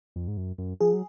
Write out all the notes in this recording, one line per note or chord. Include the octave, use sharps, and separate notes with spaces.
F2
G#2
F#2
F#2
F3 G#4
F#3